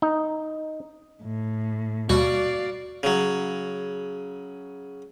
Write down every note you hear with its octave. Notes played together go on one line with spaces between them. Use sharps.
D#4
A2
D#2 B2 G3 F#4 D5 F5
C#3 F#3